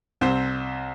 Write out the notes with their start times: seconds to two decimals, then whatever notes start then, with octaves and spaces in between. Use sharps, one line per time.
0.21 C2 C4 C5